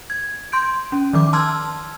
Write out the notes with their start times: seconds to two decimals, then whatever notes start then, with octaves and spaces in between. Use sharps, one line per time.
0.10 G#6
0.52 C6 G6 D7
0.92 C#4
1.13 D#3 F3 D6
1.33 A5 C6 E6 F6 G#6